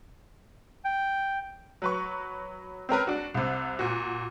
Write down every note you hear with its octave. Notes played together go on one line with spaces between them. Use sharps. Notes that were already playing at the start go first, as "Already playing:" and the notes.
G5
F#3 B4 C#6
C4 C#4 A#4 B4
D4 F#4
C2 C3
A#2 F#4